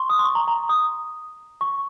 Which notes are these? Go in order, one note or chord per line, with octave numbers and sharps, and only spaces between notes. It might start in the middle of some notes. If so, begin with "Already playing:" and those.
Already playing: C6 C#6
D#6
C6
C#6
A#5
A#5
D#6
C#6